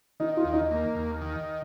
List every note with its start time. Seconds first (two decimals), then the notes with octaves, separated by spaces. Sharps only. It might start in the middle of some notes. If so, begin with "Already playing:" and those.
0.20 D#3 D#4
0.37 F4
0.44 D#2
0.53 D#4
0.71 A#3
0.95 D#2
1.21 D#3